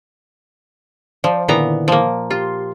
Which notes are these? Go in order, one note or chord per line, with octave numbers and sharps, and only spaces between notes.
F3 C5 D5
A#2 D3 D#3 B3 E4 A#5
F3 A#3
F4 G4 C6